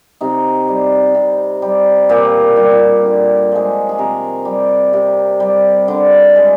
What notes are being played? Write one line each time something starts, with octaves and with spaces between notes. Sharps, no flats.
C3 D#4
G3
C3
G3
A#2 G4
G3
D3
F3 G#3
G#4
C3 A#4
G3
C3
G3
D3
G#3